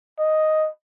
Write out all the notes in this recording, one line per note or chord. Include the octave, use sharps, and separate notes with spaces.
D#5